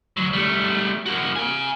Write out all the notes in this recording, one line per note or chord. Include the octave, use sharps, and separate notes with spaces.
D2 F#3
G3 A3
A#3 F#4
F5 G#5